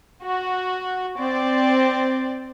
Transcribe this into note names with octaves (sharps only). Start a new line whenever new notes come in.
F#4
C4 D5